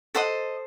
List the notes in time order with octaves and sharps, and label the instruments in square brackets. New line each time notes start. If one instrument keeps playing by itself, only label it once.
[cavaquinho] A4 C5 D#5 F#5